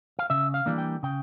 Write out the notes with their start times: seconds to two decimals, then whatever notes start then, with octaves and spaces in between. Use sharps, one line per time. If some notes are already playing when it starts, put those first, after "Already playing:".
0.19 F5
0.30 C#3 E5
0.54 F5
0.66 E3 G3 A#3 D4
0.78 G5
1.03 C#3 G5